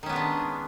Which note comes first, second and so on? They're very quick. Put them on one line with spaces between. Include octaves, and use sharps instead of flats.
D#3 C#4 B3 G#3 D4